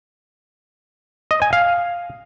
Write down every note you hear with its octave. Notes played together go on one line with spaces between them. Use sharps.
D#5
G#5
F5